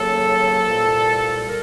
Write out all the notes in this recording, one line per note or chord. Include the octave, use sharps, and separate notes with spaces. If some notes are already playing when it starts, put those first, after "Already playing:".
Already playing: D#2 C#3 F#3 A#3 A4
C2 A#2 G3 A#3
A#4